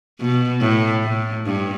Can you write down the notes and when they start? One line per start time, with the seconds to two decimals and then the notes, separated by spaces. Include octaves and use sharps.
0.20 B2
0.61 A2
1.04 A2
1.46 G2